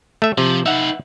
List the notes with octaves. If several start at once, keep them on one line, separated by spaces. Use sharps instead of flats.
A3 E5
C3 F3
D#4 B4 E5 F#5